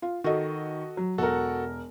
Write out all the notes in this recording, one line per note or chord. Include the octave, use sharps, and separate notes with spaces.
F4
D#3 F#4 A4 D#5
F#3
E1 F#4 A4 A#4 F#5